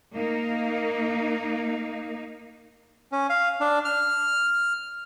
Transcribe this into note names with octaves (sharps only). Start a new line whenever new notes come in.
A#3 D#4
C#4
F5
D4
F6